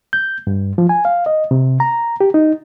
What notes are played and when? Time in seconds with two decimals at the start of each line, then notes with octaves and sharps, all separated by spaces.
0.13 G6
0.47 G2
0.78 F3
0.89 G#5
1.05 F5
1.26 D#5
1.51 C3
1.80 A#5
2.21 G4
2.34 D#4